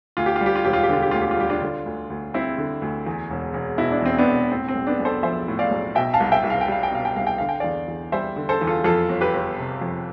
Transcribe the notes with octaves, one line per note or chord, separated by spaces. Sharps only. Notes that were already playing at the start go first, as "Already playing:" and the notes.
D2 F4
G4
F4
G3
G4
F4
E1 G4
F4
G4
D3 F4
G4
D2 F4
G4
F4
G3 G4
D4 F4
D3
D2
D2
G3 C4 E4
D3
D2
E2
E1
E1
B2 E4
D4
E2 C4
B3 D4
E1
A2 C4
C4
B1
B3 D4
B1
A4 C5
F3 C5 E5
A2
D5 F5
B1
B2 E5 G5
F5 A5
C2
E5 G5
C2
F5
G5
G3 F5
G5
B2 F5
G5
C2 F5
G5
D3 F5
G5
E2 D5 F5
E2
G3 C5 E5
D3
A4 C5
E2
F4 A4
F2 F4 A4
G1
G4 B4
G1
C3
F2